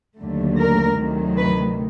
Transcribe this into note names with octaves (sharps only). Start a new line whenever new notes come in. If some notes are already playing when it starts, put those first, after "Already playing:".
D#2 D3 F#3 A3
A#4
D2 C3 D#3 F#3
B4